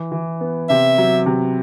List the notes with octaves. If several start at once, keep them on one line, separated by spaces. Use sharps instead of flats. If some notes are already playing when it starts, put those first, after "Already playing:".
Already playing: E3
E3
B3
C3 E5
F#3
C3